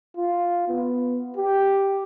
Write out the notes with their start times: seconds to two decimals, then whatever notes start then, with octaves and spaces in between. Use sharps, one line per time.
0.17 F4
0.68 B3
1.37 G4